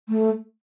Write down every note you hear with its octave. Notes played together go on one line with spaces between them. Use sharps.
A3